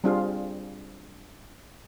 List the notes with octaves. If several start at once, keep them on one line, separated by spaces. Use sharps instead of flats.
G3 C4 D4 F4 G#4 F5